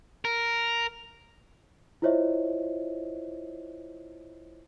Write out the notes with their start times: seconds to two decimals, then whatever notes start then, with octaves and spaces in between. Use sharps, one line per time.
0.25 A#4
2.02 E4 F4 C5 C#5 D#5 E5